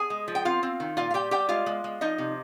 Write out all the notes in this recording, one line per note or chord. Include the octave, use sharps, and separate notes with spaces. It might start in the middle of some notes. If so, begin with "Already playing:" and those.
Already playing: G#4 G#5
G#3
F3
G5
C4 F4 F5
C4
D#3
A#2 F4 F5
F5
G3 G4 G5
G3 G4 G5
G#3 F4 F5
G#3
G#3
F3 D#4 D#5
C3